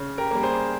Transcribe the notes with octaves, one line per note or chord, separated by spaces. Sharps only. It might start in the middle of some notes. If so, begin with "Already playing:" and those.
Already playing: C#3
G4 A#4
G3 A#3
G#4 C5